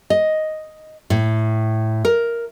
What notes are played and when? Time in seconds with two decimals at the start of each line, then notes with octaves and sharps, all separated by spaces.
0.10 D#5
1.10 A2
2.05 A#4